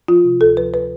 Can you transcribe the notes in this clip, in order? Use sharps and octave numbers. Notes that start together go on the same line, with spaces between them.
F3 F4
C3
D2 A4
F3 B4
B4